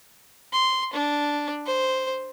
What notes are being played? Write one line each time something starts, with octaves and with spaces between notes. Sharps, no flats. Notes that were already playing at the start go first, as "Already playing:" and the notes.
C6
D4
C5